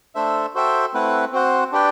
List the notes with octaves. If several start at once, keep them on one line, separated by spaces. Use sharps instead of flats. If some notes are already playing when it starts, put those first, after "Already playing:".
A3 D4 A4 C5 E5
F#4 A4 C5 E5 G5
A3 C4 E4 B4 F#5
C4 F#4 C5 F#5
D4 G4 B4 D5 G5